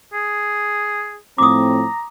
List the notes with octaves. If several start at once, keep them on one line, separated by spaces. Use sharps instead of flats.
G#4
A2 F3 C4 A#5 D6 D#6